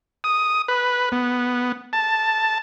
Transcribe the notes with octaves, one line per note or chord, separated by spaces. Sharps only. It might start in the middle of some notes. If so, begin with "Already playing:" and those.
D#6
B4
B3
A5